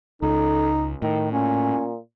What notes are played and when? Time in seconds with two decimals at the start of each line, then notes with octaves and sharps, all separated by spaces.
0.22 C#2 D#4 A4
1.02 A2 D#3
1.32 A#2 C#4